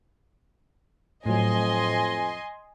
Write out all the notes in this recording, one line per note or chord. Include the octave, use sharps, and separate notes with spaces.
F2 A2 F#3 D#5 G#5 C6